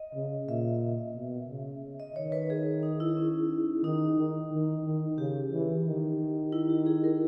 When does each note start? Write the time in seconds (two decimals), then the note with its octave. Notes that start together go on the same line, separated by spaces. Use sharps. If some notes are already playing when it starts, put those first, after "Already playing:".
Already playing: D#5
0.15 C#3
0.48 A#2 E5
1.15 B2
1.49 C#3
2.00 D#5
2.16 D#3 C#5
2.32 B4
2.50 G#4
2.83 D#4
3.00 E4
3.17 C#4
3.84 D#3 D#4
4.18 D#3
4.51 D#3
4.84 D#3
5.18 C#3 G4
5.52 E3
5.86 D#3
6.52 E4
6.70 G4
6.86 G#4
7.04 A#4